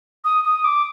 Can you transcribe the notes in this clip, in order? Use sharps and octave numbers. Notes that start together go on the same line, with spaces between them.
D#6
D#6
D6